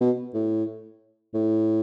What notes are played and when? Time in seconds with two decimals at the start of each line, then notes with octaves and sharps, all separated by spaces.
0.01 B2
0.34 A2
1.34 A2